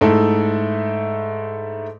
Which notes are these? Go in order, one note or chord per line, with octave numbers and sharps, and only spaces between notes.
G#2 A3 E4 A4